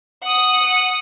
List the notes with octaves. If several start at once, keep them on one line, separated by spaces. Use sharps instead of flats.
F#5 D#6